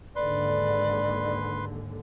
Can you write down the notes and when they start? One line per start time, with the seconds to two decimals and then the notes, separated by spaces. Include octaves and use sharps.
0.16 D#2 G#2 D3 B4 D5 C6